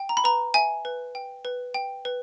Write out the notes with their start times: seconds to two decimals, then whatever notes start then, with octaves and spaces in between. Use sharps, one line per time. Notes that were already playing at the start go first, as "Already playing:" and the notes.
Already playing: G5
0.09 A#5
0.17 B5
0.24 B4 A#5
0.54 E5 G#5
0.85 B4
1.15 G5
1.45 B4
1.74 G5
2.05 B4